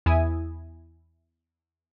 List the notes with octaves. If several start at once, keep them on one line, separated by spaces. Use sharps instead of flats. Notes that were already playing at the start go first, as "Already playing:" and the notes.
E2 E4 E5 G#5 D#6